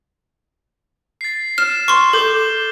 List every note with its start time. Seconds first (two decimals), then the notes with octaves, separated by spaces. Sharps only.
1.21 A6 C7
1.58 F6 E7
1.88 C6 C#6 F6
2.13 A4 D6 G6 G7